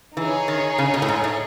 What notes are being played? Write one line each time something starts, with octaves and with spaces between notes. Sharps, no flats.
E3 D#4 G#4 C#5
D#3
C#3
B2
A2
G#2
A2